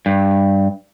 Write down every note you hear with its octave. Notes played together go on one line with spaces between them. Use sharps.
G2